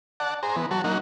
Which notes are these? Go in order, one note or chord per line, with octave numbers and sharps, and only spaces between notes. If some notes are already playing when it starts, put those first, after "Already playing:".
D5 F#5 A5
G#4 C5 A#5
E3 B3
F#3 F#4 A5
F#3 A#3 D#4 F#5